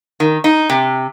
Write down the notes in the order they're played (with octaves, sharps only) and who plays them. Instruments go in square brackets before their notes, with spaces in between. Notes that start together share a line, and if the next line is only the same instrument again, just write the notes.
[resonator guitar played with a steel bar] D#3
D#4
C3